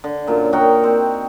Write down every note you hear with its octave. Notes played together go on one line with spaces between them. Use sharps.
D3
F#2 A#2 F#3
D#4 F#4 A#4 G5
C4